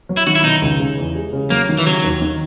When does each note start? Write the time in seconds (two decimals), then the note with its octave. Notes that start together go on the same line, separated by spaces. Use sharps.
0.09 F#3
0.17 E4
0.27 D#3 F#4
0.35 E4
0.44 B2 D#4
0.62 C#2
0.79 C#3
0.98 E2
1.15 G#3
1.33 C#3
1.50 F#3 A#3
1.69 D#3
1.79 E3
1.86 C#3 F#3
2.04 D#2
2.21 D#3